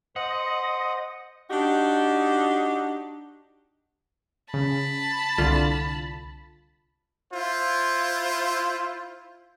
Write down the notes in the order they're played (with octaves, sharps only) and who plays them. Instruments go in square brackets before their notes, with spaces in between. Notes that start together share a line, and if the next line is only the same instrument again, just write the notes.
[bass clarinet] C5 [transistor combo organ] D#5 [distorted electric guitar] F#5
[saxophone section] D4 D#4 F#4 G4
[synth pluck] C#3 [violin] A5 B5
[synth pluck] C2 D3 F4
[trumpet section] E4 F4 C5